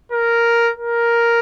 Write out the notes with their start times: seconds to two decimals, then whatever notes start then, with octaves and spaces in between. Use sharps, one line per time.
0.12 A#4
0.78 A#4